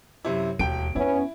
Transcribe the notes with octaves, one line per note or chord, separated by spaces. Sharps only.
F#2 C3 E4
E1 D#2 G5 D7
F2 B3 C#4 E4